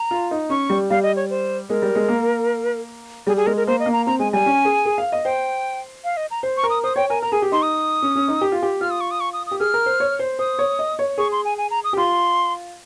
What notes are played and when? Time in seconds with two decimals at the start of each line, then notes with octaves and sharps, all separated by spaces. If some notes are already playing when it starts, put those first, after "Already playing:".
Already playing: A#5
0.11 F4
0.31 D#4
0.50 C#4 C#6
0.70 G3
0.90 G3 F5
1.03 D#5
1.16 C#5
1.30 C5
1.69 G#3 A#4
1.82 G3
1.95 G#3
2.08 A#3
3.27 G3 G#4
3.37 G#4
3.46 G#3 A#4
3.57 A#4
3.67 A#3 C5
3.80 D#5
3.86 A#3
3.93 A#5
4.06 C4 A#5
4.19 G#3 G#5
4.32 G3 G#5
4.46 C#4
4.65 G#4
4.85 G#4
4.98 F5
5.12 D#5
5.25 C5 G5
6.04 F5
6.17 D#5
6.31 A#5
6.43 C5
6.57 C#6
6.63 A#4
6.70 D#6
6.84 C5 D#6
6.96 C#5 G5
7.10 A#4 G#5
7.22 A#4 A#5
7.32 G#4 G#5
7.42 G4
7.52 D#4 C6
7.62 D#6
8.02 C#4
8.15 C#4
8.28 D#4
8.41 G4
8.52 F4
8.62 G4
8.81 F4 F6
8.91 D#6
9.01 C#6
9.11 D#6
9.20 C#6
9.33 D#6
9.47 D#6
9.51 G4
9.60 G#4 F6
9.74 A#4
9.86 C5
10.00 C#5
10.19 C5
10.39 C5 D#6
10.59 C#5
10.79 D#5
10.99 C#5
11.18 G#4 C#6
11.32 C6
11.45 G#5
11.58 G#5
11.71 A#5
11.84 D#6
11.93 G4
11.97 F4 C6